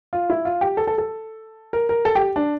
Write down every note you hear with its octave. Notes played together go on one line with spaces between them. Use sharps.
F4
E4
F4
G4
A4
A4
A4
A#4
A#4
A4
G4
D4